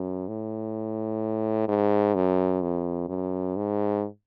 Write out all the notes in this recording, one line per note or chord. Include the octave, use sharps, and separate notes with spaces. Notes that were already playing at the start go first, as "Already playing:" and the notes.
Already playing: F#2
A2
G#2
F#2
F2
F#2
G#2